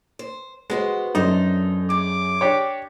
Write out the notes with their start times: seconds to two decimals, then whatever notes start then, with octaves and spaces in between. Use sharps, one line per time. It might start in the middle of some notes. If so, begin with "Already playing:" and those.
0.19 C5
0.70 G#3 B3 F#4 C5
1.15 F#2 D4 D#4 A4 C5
1.90 G#4 D6
2.41 D4 G4 C#5